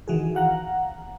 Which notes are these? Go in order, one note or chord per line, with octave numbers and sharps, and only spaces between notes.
D#3 E3 F#4 G#4
F5 F#5 A#5